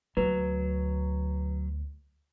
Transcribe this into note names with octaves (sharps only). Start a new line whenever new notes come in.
D2 F#3 B4